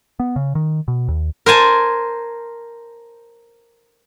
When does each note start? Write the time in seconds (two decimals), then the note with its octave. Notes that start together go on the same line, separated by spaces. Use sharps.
0.20 B3
0.36 C#3
0.55 D#3
0.88 B2
1.08 D#2
1.46 A#4 C5 G#5 A5